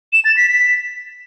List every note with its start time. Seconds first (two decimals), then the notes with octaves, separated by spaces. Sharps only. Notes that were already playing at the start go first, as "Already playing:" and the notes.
0.13 E7
0.25 A6
0.37 B6
0.49 B6